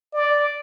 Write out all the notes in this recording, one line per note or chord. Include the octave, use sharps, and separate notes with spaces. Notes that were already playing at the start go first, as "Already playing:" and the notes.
D5